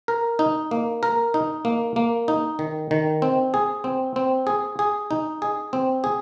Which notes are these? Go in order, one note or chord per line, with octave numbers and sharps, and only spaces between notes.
A#4
D#4
A#3
A#4
D#4
A#3
A#3
D#4
D#3
D#3
C4
G#4
C4
C4
G#4
G#4
D#4
G#4
C4
G#4